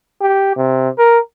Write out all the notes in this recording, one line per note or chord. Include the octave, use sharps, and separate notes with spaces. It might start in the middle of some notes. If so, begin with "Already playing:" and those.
G4
C3
A#4